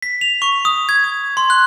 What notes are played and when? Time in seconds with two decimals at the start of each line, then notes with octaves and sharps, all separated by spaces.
0.02 B6
0.21 F7
0.42 C#6
0.65 D#6
0.89 G#6
1.04 D#6
1.37 C6
1.50 F#6